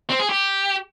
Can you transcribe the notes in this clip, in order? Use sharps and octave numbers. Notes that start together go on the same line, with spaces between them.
C4
G#4
G4